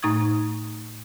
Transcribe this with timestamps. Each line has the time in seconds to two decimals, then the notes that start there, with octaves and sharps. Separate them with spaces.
0.02 A2 A3 D#4 C#6 D#6 G#6